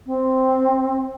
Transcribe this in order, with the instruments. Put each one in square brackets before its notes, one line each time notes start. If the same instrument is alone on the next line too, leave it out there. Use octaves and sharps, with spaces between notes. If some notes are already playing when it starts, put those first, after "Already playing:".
[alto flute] C4